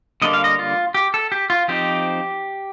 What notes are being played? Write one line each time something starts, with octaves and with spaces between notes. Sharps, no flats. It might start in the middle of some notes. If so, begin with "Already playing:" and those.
D3 G3 A#3 D4 D#5
F5
D#5
F4
G4
A4
G4
F4
F3 C4 D#4 G4